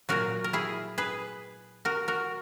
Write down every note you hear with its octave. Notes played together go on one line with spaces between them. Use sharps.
A#2 F#3 F#4 A#4
A#4
E4 G#4
G#4 B4
F#4 A#4
F#4 A#4